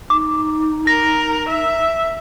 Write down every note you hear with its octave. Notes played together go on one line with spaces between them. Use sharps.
D#4 D6
A#4 A#6
E5